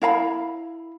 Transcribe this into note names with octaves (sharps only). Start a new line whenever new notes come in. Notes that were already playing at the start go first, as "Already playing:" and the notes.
E4 F5 A#5 B5